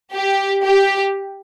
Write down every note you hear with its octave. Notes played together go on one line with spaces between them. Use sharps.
G4
G4